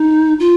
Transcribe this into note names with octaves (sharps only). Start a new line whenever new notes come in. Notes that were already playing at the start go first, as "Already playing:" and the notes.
Already playing: D#4
F4